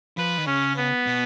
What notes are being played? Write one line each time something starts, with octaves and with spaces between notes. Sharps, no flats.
F3 B4
D#3
C#3 C#4
B3
B2